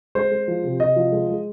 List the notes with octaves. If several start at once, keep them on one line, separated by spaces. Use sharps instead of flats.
G#3 C5
G#3
F3
C3
C3 D#5
F3
G#3
G#3